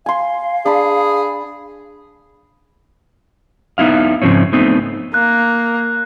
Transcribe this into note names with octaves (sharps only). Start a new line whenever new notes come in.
F5 G#5 C6
D4 G#4 B5
B3 D#4 E4 F5
G#2 C#3 F3 C4 C#4
A3 B3 C4 D#4
A#3 F#6